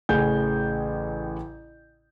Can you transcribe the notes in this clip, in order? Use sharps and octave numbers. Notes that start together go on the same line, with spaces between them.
A1 A2 C#3 G#5 G6